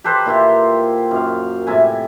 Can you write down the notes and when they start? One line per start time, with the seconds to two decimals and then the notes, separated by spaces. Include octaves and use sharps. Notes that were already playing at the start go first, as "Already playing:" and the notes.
0.04 G4 A4 B4 C5
0.26 A#2 E4 F4 G4
1.11 F#2 F5
1.67 A2 C3 E4 G#5